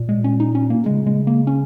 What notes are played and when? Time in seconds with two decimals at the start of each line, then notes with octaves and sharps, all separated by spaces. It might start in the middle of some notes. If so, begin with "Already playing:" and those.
Already playing: A#2
0.09 G#3
0.24 C#4
0.40 D#4
0.55 C#4
0.70 A#3
0.86 C#3 G#3
1.06 G#3
1.27 A#3
1.47 C#4